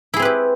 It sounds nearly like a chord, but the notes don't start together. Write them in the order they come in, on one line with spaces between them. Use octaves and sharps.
E4 G#4 C4 B4 G4